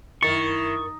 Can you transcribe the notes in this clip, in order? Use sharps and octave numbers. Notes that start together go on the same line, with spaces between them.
F#2 D#3 E4 A#4 C#6 A6